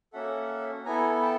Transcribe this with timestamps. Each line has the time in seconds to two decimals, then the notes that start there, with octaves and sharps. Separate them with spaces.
0.13 A#3 C#4 F#4 A4 E5 F#5
0.85 B3 E4 A4 G#5 A#5
1.22 G5 A5